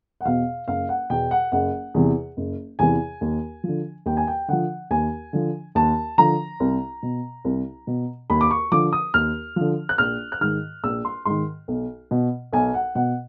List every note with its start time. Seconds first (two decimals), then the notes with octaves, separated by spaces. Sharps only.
0.21 F#5
0.25 E2 B2 F5
0.67 F#1 F5
0.89 F#5
1.10 E2 B2 G5
1.31 F#5
1.52 F#1 F#5
1.94 E2 C3 E3
2.37 F#1
2.79 E2 C3 E3 G#5
3.21 D#2
3.64 D3 F3
4.06 D#2 G5
4.17 G#5
4.27 G5
4.48 D3 F3 F#5
4.91 D#2 G#5
5.33 D3 F3
5.75 D#2 A5
6.18 D3 F3 A#5
6.60 C2
7.03 B2
7.45 C2
7.87 B2
8.30 D#2 B5
8.41 D6
8.51 C#6
8.72 D3 F3 D6
8.93 D#6
9.14 D#2 F6
9.56 D3 F3
9.89 F#6
9.98 A#1 F6
10.32 F#6
10.41 G#2 D#3 F6
10.84 A#1 E6
11.05 C6
11.25 G#2 D#3 C6
11.68 B1
12.11 B2
12.53 B1 G#5
12.74 F#5
12.95 B2 F#5